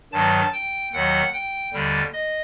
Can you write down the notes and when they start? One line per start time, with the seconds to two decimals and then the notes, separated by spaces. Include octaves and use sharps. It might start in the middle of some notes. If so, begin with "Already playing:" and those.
0.12 G2 D#3 F#3 A5
0.53 G5
0.93 D#2 D#3 F#3 F#5
1.33 G5
1.74 D#2 D3 G3
2.13 D#5